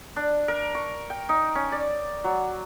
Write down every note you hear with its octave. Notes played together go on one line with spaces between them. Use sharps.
D4
A#4
C#6
G5
D#4
C#4
D5
F#3